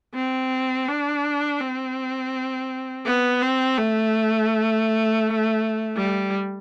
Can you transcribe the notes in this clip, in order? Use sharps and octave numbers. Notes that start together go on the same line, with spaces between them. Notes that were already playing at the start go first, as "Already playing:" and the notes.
C4
D4
C4
B3
C4
A3
G3